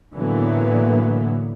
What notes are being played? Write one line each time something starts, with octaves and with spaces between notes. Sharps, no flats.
A2 D3 E3 F#3 A#3 B3